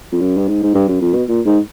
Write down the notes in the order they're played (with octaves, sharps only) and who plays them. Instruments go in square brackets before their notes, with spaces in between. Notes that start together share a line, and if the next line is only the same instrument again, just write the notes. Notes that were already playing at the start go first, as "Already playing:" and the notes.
[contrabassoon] F2
F#2
G2
G#2
G#2
G2
F#2
F2
B2
A#2
G#2